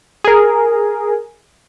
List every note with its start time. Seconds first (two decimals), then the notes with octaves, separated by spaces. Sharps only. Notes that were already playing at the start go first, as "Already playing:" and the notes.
0.24 G#4 A#4